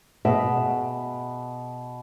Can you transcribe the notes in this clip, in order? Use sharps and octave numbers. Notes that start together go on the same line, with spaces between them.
B2 G#4 E5